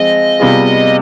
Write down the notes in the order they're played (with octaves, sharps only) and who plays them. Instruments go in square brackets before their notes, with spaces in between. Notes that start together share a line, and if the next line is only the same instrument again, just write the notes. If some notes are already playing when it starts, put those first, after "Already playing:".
Already playing: [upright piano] F3 G#3 C4 [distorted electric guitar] D#5
[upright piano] C3 G3 B3 F4 G#4